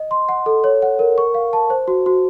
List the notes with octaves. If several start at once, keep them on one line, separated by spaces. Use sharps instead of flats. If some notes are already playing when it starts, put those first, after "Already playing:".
Already playing: D#5
C6
F#5
A4
C#5
F#5
A#4
C#6
F5
A5
C5
F#4
F#4